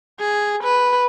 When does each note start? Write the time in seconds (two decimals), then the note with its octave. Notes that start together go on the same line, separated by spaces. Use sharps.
0.20 G#4
0.63 B4